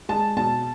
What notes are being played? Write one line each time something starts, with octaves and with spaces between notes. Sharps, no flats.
G#3 A5
B2 A5